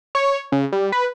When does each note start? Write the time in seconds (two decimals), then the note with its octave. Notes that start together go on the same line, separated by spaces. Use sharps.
0.15 C#5
0.52 C#3
0.72 G3
0.92 B4